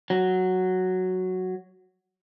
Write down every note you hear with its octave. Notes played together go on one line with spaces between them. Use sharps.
F#3